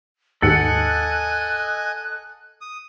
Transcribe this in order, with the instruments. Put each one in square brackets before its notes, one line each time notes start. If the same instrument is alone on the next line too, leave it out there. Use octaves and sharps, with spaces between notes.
[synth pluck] D#2 G#2 [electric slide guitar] A4 F#5 [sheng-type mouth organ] D#5 G#5 [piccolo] F#6
[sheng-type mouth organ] D#6